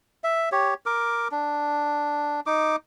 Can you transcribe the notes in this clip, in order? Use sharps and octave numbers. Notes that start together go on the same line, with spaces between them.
E5
G4 C#5
A#4 D6
D4
D#4 D6